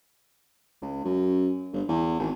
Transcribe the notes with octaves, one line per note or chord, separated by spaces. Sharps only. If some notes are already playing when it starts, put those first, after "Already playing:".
C#2
F#2
G1
E2
G#1